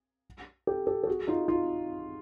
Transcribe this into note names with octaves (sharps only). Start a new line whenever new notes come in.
G4 A4
G4 A4
A4
F#4 G#4
D#4 F4
D#4 F4